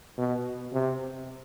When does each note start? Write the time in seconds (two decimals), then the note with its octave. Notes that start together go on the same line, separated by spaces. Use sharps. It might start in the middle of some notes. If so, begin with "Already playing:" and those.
0.18 B2
0.73 C3